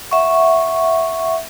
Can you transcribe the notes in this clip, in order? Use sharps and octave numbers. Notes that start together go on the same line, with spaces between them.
E5 F#5 C#6